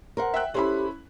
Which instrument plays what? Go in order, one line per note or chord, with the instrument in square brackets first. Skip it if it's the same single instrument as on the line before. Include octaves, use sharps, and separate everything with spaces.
[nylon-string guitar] A#4 C5 F#5
[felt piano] E5 G5 F#6
[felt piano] C#4 E4 B5 [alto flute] G4 [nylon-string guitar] A4 C5